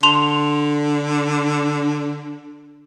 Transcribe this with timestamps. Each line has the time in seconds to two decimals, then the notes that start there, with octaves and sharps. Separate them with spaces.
0.03 D3 A5 C6 F7